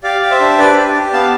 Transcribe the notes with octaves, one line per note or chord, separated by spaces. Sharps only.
G4 D5 F5
G4
C5 E5
D4
D4 B4 D5
G4
G4
B3 F5 A5